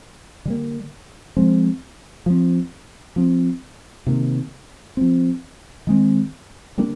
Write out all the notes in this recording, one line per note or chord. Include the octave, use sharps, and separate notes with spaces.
D3 G3 A#3
F3 G#3 C4
F3 C4
F3 C4
C3 D#3 A#3
F3 C4
D#3 G#3 C4
D3 G3 A#3 D4